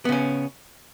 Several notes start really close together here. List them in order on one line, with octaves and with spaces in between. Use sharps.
B3 C#3 C#4